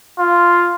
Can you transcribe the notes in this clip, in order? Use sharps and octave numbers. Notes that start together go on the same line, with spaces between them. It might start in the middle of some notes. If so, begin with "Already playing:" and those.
F4